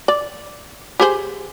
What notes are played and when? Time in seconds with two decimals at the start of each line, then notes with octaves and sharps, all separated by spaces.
0.08 D5
1.00 G4 G#4 C5